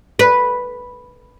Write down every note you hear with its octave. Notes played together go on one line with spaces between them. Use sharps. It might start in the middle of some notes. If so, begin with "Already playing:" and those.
B4